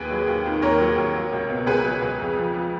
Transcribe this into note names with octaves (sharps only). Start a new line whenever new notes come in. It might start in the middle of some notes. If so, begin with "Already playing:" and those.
Already playing: D#2 G#4 B4
F#3
D#2
D#3
D#2 A#4 C#5
F#3
D#2
F#3
C#2
B2
C#2 G#4 B4
F#3
C#2
F2
F3
F3